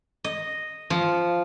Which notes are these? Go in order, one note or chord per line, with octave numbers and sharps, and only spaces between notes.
D#5
F3